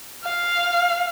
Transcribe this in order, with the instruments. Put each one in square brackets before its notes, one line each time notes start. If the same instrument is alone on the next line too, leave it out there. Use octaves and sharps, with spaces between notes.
[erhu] F5